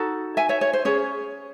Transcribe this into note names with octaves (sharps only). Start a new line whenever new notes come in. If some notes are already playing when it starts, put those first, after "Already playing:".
Already playing: D#4 F#4 A4
E5 G#5
C#5 E5
C#5
C5
C#4 G#4 C#5